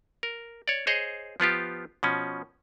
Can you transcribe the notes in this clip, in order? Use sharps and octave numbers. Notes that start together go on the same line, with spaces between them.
A#4
C#5 D5
G#4 C5 C#5 D#5
F3 B3 F4 G4
B2 F3 C#4